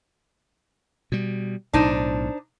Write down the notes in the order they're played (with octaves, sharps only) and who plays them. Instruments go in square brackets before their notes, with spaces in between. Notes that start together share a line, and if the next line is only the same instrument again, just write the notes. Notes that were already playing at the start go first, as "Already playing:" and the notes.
[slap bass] B2 G3
[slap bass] B1 A2 [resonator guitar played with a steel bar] D4 D#4 C5